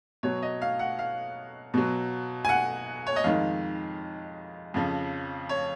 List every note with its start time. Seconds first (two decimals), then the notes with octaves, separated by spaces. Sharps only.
0.23 B2 F#3 C#5
0.42 D#5
0.62 F5
0.79 F#5
0.99 F5
1.74 B2 F#3
2.45 G#5
2.49 F#5
3.07 C#5
3.16 D#5
3.24 F2 D#3 G#3 F5
4.74 F2 C#3 F3
5.49 C#5